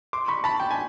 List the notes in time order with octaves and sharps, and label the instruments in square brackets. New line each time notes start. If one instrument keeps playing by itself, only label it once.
[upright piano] C6 D6
B5 C#6
A5 B5
G5
G#5